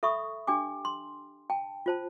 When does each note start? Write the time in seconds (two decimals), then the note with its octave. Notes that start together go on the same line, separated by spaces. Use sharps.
0.03 A4 E5 B5 C#6 D#6
0.47 D4 G4 G5 G#5 D6
0.85 C6
1.50 G5 A5
1.86 F4 C5 A5